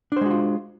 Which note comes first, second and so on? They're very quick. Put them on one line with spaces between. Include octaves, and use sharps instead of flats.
D4 C5 G#3 F#4 F4